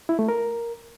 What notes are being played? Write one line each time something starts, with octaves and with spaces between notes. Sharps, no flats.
E4
A3
A#4